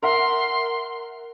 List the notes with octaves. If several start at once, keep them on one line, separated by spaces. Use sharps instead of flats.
A#4 E5 F#5 C6